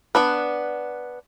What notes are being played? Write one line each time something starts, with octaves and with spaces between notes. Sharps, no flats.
B3 D4 B4